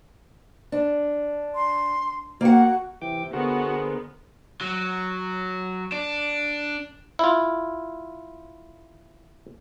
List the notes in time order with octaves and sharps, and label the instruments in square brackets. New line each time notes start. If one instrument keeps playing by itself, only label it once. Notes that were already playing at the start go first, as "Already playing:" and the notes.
[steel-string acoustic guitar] D4
[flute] C6
[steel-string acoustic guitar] A#3 F#5 [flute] F#4
[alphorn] C3 [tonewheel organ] E3 G5 D6
[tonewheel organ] D3 A#4 C5 [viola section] B3 [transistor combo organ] F#4 [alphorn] G#4
[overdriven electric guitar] F#3
D4
[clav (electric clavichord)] E4 F4